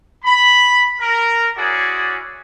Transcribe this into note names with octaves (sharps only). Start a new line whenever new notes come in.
B5
A#4
C#4 E4 F#4 G#4 D5